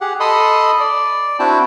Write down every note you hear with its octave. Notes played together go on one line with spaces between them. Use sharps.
G4 G#4 F#5
A4 D#5 B5 C6 D#6
D5
C4 D4 E4 F#4 G5 A5